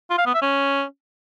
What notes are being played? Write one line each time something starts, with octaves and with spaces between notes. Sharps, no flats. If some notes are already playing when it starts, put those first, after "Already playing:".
F4
F5
B3
E5
C#4